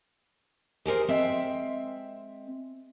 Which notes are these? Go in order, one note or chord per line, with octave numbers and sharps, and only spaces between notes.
G4 G#4 A#4 C5
G#3 C4 E5 G5